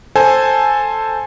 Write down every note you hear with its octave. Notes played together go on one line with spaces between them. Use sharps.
A4 C5 G#5 A5